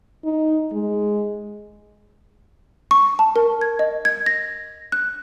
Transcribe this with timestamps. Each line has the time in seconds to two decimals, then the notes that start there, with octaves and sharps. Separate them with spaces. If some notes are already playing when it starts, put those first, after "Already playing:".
0.25 D#4
0.73 G#3
2.91 C#6
3.19 A5
3.36 A#4
3.61 G#6
3.79 D#5
4.05 G#6
4.26 A#6
4.92 F#6